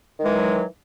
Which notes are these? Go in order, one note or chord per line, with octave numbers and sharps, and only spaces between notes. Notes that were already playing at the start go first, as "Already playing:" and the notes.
D#3 E3 F#3 G#3